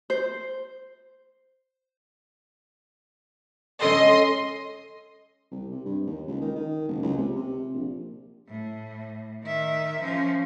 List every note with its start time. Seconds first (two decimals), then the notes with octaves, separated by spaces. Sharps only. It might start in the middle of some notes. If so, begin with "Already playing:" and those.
0.10 C5
3.81 G#3 C#4 A4 D#5 C6
5.52 C2
5.71 C3
5.85 G2
6.07 D#2
6.27 C#2
6.42 D#3
6.56 D#3
6.89 F#1
7.03 C#2
7.18 C3
7.36 C3
7.74 A#1
8.48 A2
9.44 D#3 E5
10.00 F3 C#4